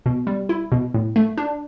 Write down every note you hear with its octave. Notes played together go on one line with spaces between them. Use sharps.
B2
G3
E4
B2
A2
A3
D4